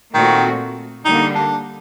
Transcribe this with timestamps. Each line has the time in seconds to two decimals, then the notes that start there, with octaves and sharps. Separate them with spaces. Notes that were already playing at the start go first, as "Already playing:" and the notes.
0.14 A#2 D#3 A3 C4 F#4
1.05 D3 G3 A#3 D#4
1.35 D4